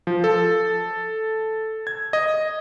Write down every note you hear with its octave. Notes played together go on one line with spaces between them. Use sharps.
F3
A4
G#6
D#5